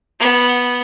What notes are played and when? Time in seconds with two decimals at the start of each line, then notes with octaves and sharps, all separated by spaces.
0.19 B3